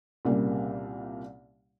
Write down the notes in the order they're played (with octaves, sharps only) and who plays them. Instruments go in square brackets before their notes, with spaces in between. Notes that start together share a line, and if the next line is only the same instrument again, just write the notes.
[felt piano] C2 A#2 C#3 G3 A#3